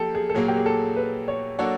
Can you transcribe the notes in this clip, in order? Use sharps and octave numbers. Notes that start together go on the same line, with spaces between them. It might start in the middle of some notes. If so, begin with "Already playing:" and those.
Already playing: F3 A#3 G4 A4
G#4
A4
A#2 F#3 A#3 G#4
G4
G#4
A4
B4
C#5
F#3 A#3 D4 F#4 A4 C#5